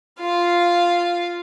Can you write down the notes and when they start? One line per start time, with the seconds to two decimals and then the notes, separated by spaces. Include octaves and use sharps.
0.20 F4 F5